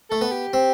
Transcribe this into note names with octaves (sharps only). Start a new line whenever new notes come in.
A3 A4
B3
G4
C4